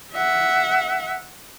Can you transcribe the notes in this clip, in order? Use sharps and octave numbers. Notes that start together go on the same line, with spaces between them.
E5 F#5